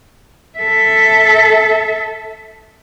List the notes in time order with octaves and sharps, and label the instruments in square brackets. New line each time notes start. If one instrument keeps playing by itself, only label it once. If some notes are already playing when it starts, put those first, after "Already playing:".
[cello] A4 E5